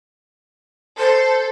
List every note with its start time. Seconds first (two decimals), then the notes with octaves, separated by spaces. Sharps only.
0.98 A4 C5